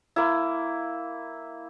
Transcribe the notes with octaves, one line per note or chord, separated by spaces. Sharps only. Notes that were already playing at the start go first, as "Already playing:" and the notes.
A#3 E4